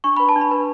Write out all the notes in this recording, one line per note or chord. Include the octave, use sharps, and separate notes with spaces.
D4 C#6
B4 B5
A5
D4
B5
B4